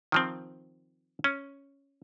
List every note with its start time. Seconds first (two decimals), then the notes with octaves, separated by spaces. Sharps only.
0.12 D#3 F3 C4
1.24 C#4